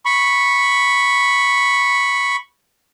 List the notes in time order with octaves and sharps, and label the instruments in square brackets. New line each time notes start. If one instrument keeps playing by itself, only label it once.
[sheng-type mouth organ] B5 C#6